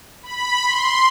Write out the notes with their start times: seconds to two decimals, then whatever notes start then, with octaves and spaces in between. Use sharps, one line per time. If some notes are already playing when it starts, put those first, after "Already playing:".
0.23 B5
0.63 C6